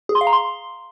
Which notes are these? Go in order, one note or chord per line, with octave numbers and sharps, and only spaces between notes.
G#4
C6
F5
A#5
C6